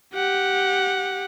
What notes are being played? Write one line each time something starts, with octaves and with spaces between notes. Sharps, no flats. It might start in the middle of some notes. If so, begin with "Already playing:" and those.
G4 F#5